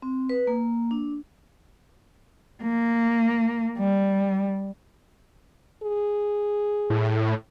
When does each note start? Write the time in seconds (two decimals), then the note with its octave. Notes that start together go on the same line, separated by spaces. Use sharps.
0.02 C4
0.29 B4
0.47 A#3
0.91 D4
2.63 A#3
3.78 G3
5.83 G#4
6.90 A2